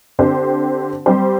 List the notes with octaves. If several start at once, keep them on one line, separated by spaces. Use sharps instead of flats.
D3 C4 G4 C5
G3 C4 G4 C5